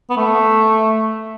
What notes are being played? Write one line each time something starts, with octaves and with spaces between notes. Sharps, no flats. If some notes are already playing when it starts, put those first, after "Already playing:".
B3
A3